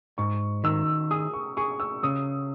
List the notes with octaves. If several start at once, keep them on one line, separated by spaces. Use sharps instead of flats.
G#2 C#6
D#3 E6
G#4 D#6
C#6
G#4 C#6
E6
C#3 D#6